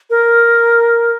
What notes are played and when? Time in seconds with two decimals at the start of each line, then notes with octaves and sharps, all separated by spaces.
0.10 A#4